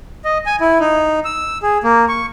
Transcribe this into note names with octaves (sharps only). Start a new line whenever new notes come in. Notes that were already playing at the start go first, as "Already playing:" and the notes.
D#5
G#5
E4
D#4
E6
G#4
A#3
C#6